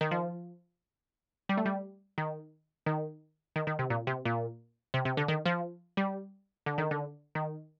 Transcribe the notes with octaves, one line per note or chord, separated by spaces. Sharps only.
D#3
F3
G3
A3
G3
D#3
D#3
D#3
D#3
C3
A#2
C3
A#2
C3
C3
D3
D#3
F3
G3
D3
D#3
D3
D#3